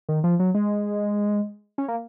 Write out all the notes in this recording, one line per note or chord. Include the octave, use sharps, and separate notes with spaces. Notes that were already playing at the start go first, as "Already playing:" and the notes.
D#3
F3
F#3
G#3
C#4
A#3